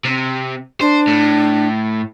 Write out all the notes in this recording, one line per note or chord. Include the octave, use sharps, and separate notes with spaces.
C3
D4 C5
A2